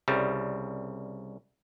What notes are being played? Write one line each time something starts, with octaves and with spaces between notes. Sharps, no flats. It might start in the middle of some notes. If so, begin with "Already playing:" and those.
C2 C#3 G3